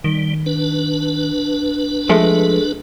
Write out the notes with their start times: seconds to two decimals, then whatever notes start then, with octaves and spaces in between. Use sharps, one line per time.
0.04 D#3 G3
0.46 D4 B4
2.09 F3 G#3 A3